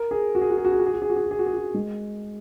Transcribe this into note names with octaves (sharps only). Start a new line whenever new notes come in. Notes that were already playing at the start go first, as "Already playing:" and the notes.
Already playing: A#4
G#4
F#4
G#4
F#4
G#4
F#4
G#4
F#4
G#4
F#4
G#4
F#4
G#4
F#4
G#4
F#4
G#4
F#4
G#3